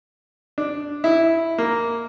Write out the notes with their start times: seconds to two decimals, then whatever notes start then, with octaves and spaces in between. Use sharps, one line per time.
0.58 D4
1.04 E4
1.58 A#3